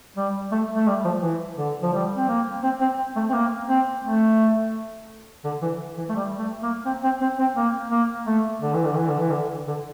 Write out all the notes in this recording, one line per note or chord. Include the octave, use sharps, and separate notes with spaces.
G3
A3
A3
G3
F3
E3
D3
F3
G3
C4
A#3
C4
C4
A3
C4
A#3
C4
A3
D3
E3
E3
A3
G3
A3
A#3
C4
C4
C4
C4
A#3
A#3
A3
D3
E3
D3
E3
D3
E3
D3
D3